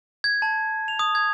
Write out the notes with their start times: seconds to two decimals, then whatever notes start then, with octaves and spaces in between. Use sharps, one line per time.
0.24 G#6
0.42 A5
0.88 F7
0.99 D#6
1.15 G#6